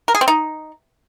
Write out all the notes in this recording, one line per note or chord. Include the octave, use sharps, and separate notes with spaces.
A#4
G#4
C4
D#4